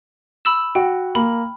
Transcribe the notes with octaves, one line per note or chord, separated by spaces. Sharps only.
B5 E6 E7
F#4 G5
A#3 B5